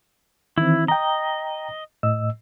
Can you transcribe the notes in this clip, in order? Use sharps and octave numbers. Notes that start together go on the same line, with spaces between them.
D#3 E3 C4 E4
D#5 G5 A#5
A2 D#5 E6